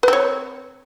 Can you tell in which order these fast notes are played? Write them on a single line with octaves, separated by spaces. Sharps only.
B4 C4 C#5